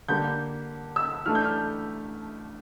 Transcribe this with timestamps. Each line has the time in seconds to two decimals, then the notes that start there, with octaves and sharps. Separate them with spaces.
0.09 D3 G3 A#3 G6
0.96 E6
1.26 E3 A3 D4 F6
1.35 G6
1.45 F6